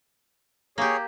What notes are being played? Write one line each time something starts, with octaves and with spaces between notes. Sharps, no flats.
A#3 G4 G#4 C#5